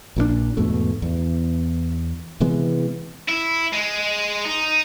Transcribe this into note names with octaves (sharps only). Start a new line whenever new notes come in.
A#1 A#2 D#3 D4
E2 G#2 B2 A3
E2
C3 E3 G#3 B3
E4
G#3
D#4